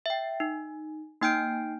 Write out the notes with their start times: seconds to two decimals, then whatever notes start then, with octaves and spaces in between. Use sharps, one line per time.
0.06 E5 G5
0.40 D#4
1.21 A#3 D#4 G5 F6 G6 D7